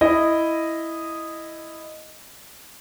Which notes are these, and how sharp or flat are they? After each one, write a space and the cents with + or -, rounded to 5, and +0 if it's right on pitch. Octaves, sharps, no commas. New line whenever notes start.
E4 +0 D#5 -5